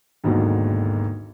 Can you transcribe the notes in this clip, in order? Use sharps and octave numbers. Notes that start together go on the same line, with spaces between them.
G#1 D#2 G#2 B2 D3 F#3